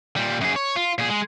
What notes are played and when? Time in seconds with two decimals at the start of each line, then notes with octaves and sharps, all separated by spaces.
0.16 A#2 G3
0.41 F#2 G#4
0.56 C#5
0.76 F4
0.98 A#2 G#4
1.10 G#3